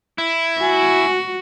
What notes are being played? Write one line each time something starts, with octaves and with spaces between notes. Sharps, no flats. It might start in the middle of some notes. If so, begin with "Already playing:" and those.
E4
F#4 G#5